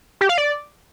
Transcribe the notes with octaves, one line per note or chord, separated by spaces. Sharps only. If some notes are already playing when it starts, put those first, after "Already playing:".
G4
F5
D5